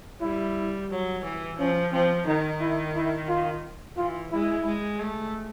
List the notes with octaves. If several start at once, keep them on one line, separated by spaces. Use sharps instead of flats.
G3 E4
F#3
E3
F3 C#4
F3 C4
D#3 D#4
E4
E4
F4
E3 F4
G#3 E4
G#3
A3